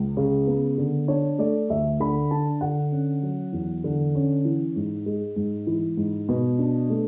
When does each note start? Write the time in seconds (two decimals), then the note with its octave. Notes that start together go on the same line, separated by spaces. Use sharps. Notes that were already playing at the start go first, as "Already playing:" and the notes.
Already playing: C#2
0.17 C#3
0.47 B3
0.78 D3
1.08 D4 C#5
1.39 A3 D5
1.69 D2 E5
2.00 D3 B5
2.31 D4 A5
2.61 D3 F#5
2.92 C#4
3.23 F#3
3.53 E2
3.84 D3
4.15 C#4
4.45 E3
4.76 G#2
5.06 G#3
5.36 G#2
5.67 E3
5.97 G#2
6.28 B2 B4
6.59 D4
6.90 A3